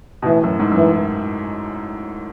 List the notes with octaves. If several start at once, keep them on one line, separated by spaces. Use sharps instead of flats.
B2
A2 E3
F#2
G#2
F#2 E3